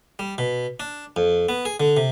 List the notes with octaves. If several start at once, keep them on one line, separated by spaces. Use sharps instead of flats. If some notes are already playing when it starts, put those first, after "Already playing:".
G3
B2
D4
F2
B3
G#4
D3
C3